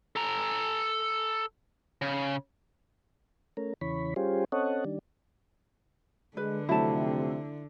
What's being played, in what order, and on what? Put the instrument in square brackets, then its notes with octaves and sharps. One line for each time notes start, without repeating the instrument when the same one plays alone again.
[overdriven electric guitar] A4 A#5
C#3
[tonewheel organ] A3 C#4 A#4
E2 C#3 E3 C#5 B5
G3 C#4 F4 G4 G#4 C5
C4 C#4 A4 C#5 D#5 F#5
D#3 G3 D4
[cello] D3 [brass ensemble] G#3 [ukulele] B4
[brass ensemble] F2 C3 [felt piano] F#3 A3 [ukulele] E4 A5